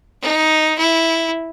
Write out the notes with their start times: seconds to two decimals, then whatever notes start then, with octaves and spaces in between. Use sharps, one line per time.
0.22 D#4
0.78 E4